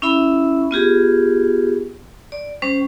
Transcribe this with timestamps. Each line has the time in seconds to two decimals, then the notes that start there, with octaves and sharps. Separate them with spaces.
0.02 C#4 E4 E5 B5
0.71 B3 F4 G4 G#4
2.32 D5
2.62 G3 C#4 C5